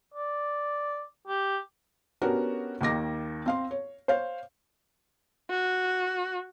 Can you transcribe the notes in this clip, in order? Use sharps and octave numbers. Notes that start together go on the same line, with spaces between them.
D5
G4
B3 C#4 D4 F#4 G4 A#4
D#2 D#3 D6 A#6
C4 F5 C6
C#5
C5 C#5 F5
F#4